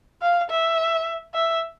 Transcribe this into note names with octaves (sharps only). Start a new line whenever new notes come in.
F5
E5
E5